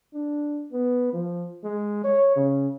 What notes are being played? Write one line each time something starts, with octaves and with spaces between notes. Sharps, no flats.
D4
B3
F3
G#3
C#5
C#3